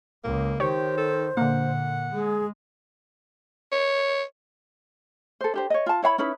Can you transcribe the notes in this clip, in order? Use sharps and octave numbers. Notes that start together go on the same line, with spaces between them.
C#2 A#3
D#3 G4 C5 C#5
A4
A#2 D3 A#3 F#5
G#3 G#4
C#5
A4 C5
D4 G4 C5
C#5 D#5
F4 A5
E4 C#5 F5 B5
C#4 D#4 E4 B4